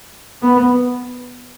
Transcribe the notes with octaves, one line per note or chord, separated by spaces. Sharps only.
B3